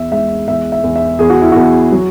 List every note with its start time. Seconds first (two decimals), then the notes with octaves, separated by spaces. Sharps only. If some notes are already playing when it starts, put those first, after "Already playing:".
Already playing: E2 E5
0.11 G#3 E5
0.48 E2 E5
0.72 E5
0.84 E2
0.96 E5
1.19 E2 G#4
1.30 F#4
1.42 E4
1.52 E2 F#4
1.92 F#3